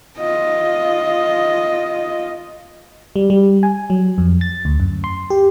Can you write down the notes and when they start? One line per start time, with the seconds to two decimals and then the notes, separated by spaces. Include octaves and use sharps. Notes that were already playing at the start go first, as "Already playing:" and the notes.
0.18 F4 D#5
3.16 G3
3.30 G3
3.63 G#5
3.90 F#3
4.18 F2
4.41 A6
4.65 D2
4.80 F#2
5.04 C6
5.30 G4